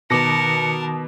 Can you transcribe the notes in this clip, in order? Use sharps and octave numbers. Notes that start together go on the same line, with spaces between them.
B2 D#3 A#4 A5 D6 A#6 C#7